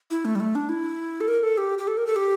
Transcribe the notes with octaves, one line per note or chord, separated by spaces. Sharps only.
E4
A3
G3
A3
D4
E4
A4
A#4
A4
G4
G4
A4
A#4
A4
G4